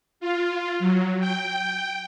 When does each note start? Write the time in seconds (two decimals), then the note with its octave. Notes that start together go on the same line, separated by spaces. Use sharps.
0.20 F4
0.79 F#3
1.20 G5